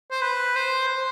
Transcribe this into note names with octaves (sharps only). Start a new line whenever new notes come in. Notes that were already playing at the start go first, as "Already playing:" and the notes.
C5
B4
C5
C5